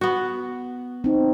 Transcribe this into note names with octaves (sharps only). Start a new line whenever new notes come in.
B3 F#4
C4 D#4